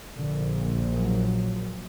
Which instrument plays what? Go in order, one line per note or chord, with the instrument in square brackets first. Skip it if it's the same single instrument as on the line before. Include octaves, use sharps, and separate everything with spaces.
[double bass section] A#1 A#2 D3
F#3